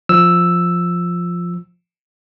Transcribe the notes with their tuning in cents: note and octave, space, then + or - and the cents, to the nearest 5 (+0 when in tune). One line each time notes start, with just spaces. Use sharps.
F3 +0 E6 +0